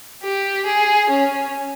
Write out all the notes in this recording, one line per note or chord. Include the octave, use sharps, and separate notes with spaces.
G4
G#4
C#4